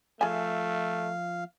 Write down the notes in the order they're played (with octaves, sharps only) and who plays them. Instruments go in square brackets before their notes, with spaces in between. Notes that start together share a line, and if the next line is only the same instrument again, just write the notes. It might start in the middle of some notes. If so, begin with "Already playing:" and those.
[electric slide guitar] F3 F4 E5 [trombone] A3 [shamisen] G#4 D5 G#5 [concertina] F5